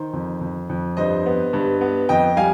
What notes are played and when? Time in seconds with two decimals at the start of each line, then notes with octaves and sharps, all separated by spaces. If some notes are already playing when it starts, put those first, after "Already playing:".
Already playing: D#3 C5
0.13 F2
0.41 F2
0.69 F2
0.97 G2 C5 D#5
1.26 B3
1.53 G2
1.81 B3
2.09 F2 D#5 G5
2.37 G3 F5 G#5